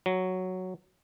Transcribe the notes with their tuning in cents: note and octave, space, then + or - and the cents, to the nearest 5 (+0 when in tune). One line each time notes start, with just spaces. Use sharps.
F#3 +0